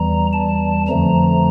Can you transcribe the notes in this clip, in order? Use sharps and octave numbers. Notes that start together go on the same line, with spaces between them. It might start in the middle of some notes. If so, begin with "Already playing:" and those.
Already playing: E2 E3 G3 A#5
A5
F2 D3 F3 A3 A#5